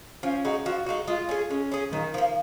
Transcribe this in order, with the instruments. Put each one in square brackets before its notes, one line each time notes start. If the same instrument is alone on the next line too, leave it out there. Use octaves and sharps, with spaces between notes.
[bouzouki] F3 [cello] C#4
[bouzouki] G#3 D#4 F#4
[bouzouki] F3 [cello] F#4
[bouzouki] G#3 D#4 F#4
[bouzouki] G#3 [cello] F4
[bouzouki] C#4 G#4
[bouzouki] G#3 [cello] C#4
[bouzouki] C#4 G#4
[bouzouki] A#2 [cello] D#3
[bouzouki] F3 A#3